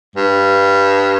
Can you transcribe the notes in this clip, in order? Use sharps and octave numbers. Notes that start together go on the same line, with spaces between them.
G2